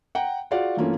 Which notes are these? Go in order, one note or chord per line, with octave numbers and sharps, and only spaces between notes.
F#5 G5 A#5
F4 F#4 G#4 D5 F5 F#5
G2 E3 A3 A#3 C#4 F4